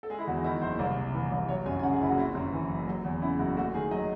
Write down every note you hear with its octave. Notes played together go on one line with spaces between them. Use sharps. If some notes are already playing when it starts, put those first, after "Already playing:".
A4
G#3 G#4
E4
E2 F#4
D#4
D#3 E4
F#1 C5
C2
C3
E3
C2
F#3 C#5
F#2 G#5
G#5
C#3 F#5
G#4
F#1 E4
F#4
C4 E4
F#2
E3
F#1
F#3
E2
C#3 E4
F#1 F#4
A3 F#4
D#3 G#4
F#3 D#5